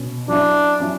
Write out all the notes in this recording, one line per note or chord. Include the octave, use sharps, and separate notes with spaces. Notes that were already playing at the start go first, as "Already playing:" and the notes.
Already playing: B2 C#4
F#3 C#4 D4 E4
F#3 C#4 E4